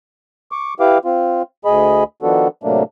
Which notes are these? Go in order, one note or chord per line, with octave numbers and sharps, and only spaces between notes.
C#6 D6
E4 G4 B4 F5 D6
C4 F4
D2 G#4 D#5 B5
D#3 F3 B3 D4 F#4 A4
A2 C3 F#3 A3 A#3 D4